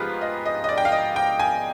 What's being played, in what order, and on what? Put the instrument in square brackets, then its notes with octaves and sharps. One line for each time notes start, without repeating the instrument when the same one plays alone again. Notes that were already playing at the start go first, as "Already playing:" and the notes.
Already playing: [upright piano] G#2 F3 B3 F4 G4 G#4 B4
D#5
D#5
D#5
D5
G5
F5
D#5
G5
G#5